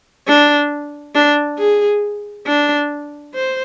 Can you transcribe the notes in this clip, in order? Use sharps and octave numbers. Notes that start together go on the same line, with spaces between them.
D4
D4
G#4
D4
C5